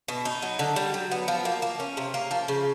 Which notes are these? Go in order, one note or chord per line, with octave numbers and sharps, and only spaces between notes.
B2
D#4
F#3
D3
G3
F#3
B3
F3
A#3
A#3
C#4
C3
A#3
F3
C#3